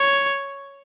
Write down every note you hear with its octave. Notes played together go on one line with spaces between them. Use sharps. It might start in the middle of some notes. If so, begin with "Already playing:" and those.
Already playing: C#5